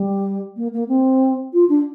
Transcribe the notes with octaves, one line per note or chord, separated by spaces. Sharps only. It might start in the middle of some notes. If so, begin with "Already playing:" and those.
Already playing: G3
A#3
A#3
C4
F4
D4